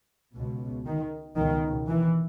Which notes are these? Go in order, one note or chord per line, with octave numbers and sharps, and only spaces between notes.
C#2 B2
D#3
C#2 B2 D#3
E3